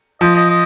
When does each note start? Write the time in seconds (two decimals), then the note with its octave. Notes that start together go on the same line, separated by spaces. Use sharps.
0.21 F3 D#5
0.36 D#5
0.50 D#5